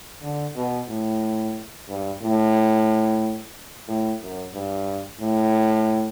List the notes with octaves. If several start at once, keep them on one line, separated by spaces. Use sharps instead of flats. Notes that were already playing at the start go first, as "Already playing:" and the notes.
D3
B2
A2
G2
A2
A2
F#2
G2
A2